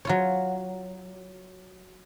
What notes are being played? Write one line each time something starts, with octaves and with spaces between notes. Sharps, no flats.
F#3 F4 C#5